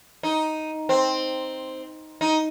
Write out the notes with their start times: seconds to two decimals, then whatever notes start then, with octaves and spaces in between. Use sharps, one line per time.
0.23 D#4
0.89 C4
2.21 D#4